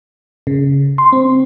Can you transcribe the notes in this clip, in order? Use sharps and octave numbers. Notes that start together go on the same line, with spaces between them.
C#3
C6
C4